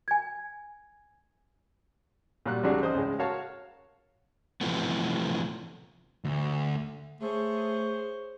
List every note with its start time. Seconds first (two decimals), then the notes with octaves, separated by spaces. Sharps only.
0.08 G#5 G#6
2.46 A#2 F#3 G3 F#6
2.64 B1 C#3 F#3 G3 D4 G#4
2.82 A1 C5 D#5 D#6
2.95 C#2 A2 G#3
3.19 F#4 A#4 C#5 F5 A5 F6
4.61 C3 E3 F3 A3 B3
6.25 D2
7.21 A3 G#4 C5 C#5